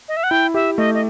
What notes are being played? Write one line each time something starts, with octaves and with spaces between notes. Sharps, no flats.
D#5
E5
F#5
E4 G5
G4 E5
A3 D#5
D#5